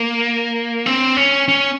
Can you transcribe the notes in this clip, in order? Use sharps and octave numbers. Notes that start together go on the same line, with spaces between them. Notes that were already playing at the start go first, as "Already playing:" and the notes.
Already playing: A#3
C4
C#4
C#4